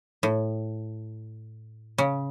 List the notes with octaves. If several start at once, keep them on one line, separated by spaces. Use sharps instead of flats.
A2
C#3